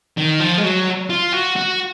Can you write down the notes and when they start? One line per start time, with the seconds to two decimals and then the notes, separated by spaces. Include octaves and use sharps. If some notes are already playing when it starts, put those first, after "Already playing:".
0.18 D#3
0.40 F3
0.58 G#3
0.64 F#3
1.10 F4
1.33 F#4
1.56 F#4